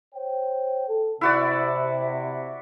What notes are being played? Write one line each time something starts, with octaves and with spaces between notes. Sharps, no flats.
C5 C#5 G5
A4
C3 E4 F#4 D5